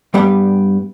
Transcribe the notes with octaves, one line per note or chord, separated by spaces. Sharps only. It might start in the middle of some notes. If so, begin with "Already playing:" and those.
G2 G3 B3